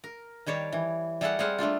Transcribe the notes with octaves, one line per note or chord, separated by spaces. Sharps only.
A#4
D#3 G3 C#5 A5
E3
G3 A3 G#4 A4 F5 F#5
G3 C4 G#4 F5 F#5
G3 A3 D4 F4